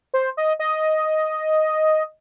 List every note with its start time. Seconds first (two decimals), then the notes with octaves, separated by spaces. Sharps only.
0.14 C5
0.37 D#5
0.59 D#5